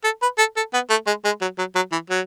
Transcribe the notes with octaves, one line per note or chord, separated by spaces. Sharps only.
A4
B4
A4
A4
B3
A3
G#3
G#3
F#3
F#3
F#3
E3
F#3